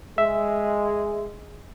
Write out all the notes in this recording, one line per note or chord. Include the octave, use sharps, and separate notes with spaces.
G#3 E5